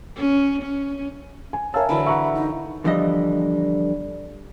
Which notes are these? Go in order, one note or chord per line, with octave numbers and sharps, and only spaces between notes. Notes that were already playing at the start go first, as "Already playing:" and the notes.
C#4
C#4
G#5
A#4 C#5 E5 F5 G#5 A5 E6
D3 E3 F#3 B5
E5 F#5 A#5 C#6
D#4
E2 D3 E3 F3 G3 D#5